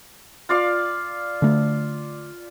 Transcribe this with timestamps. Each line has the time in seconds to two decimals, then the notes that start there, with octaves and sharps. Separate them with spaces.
0.49 F4 D5 F5
1.42 D3 A3